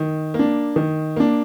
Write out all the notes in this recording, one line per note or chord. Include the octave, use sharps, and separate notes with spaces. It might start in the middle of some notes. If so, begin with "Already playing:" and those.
Already playing: D#3
A#3
D4
D#3
A#3 D4